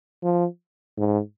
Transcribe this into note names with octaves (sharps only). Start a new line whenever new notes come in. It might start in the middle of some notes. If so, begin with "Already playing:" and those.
F3
G#2